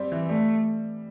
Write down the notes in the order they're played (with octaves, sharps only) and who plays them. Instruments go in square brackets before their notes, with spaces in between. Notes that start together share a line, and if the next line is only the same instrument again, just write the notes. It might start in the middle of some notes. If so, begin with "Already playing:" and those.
Already playing: [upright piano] G3 C4
E3
[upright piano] G3 [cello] A3